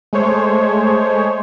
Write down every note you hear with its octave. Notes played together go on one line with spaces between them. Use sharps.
G#3 A3 C5 C#5